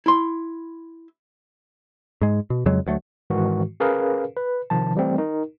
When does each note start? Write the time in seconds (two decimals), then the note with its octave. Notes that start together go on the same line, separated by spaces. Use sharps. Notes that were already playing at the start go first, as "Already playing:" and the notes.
0.06 E4 C6
2.21 G#2 G#3
2.50 B2
2.66 F2 C#3 F#3 G#3
2.87 D2 F#3 A3
3.30 G#2 D#3 E3 G#3 F#4
3.80 C#4 G#4 A#4 B4 F5
4.36 B4
4.70 C3 D#3 F3 A5
4.95 E3 G3 A3 C4
5.18 D#4 A#4